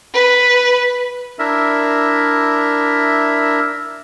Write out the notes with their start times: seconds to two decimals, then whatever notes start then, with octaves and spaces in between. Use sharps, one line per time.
0.14 B4
1.39 D4 E4 A#4 E5